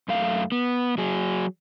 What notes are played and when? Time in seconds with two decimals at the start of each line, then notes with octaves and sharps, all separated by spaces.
0.08 F#2 A3 F5
0.52 B3
0.98 F#3 G#4